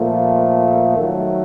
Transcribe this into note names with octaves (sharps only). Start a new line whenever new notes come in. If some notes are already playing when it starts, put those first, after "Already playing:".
Already playing: A#2 F3 A3
D#3 F#3 A3